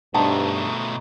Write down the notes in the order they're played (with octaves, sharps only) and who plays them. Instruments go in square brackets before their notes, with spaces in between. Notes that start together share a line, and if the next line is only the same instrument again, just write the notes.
[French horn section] G2 [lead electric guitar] B2 A3 [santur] D#4 C5 [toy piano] F#5 A5